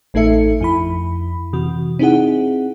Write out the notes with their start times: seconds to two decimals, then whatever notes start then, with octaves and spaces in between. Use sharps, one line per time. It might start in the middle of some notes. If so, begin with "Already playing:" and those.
0.14 A1 A3 D#4 A4 E5 C#7
0.61 F2 E4 B5
1.53 C3 E3 F#4
1.99 C4 D#4 E4 G#4 F#5